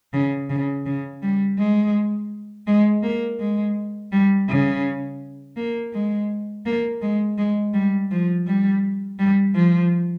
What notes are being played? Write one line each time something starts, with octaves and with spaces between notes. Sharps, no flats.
C#3
C#3
C#3
G3
G#3
G#3
A#3
G#3
G3
C#3
A#3
G#3
A#3
G#3
G#3
G3
F3
G3
G3
F3